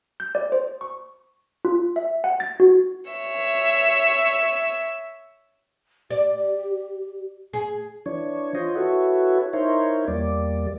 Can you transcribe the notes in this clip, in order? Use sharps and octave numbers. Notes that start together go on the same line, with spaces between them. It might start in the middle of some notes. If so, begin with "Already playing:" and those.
G6
D5
C5
C#6
F4
E5
F#5
A6
F#4
C#5 E5
G4 D5
G#4
E3 D4 C#5
F4 C5 C#5 D#5
E4 F#4 A4 B4 C#5
D#4 E4 A#4 C5 C#5
E2 G3 A#3 D5